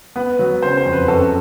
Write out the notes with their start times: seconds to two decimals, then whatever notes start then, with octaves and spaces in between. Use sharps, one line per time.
0.16 B3 B4
0.39 F#3
0.62 C#3 C5
0.77 C5
0.86 F2
0.93 B4
1.08 F#2 A4